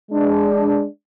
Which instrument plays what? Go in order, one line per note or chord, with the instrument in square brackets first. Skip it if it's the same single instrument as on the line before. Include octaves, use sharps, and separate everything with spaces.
[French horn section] G#3 D4